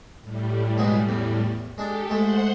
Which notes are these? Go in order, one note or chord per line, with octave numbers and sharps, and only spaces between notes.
A2 G3
B2 F#3 G#3
E2
G#3 D4 G4 A4
G#3 A3 C5 F#5 C6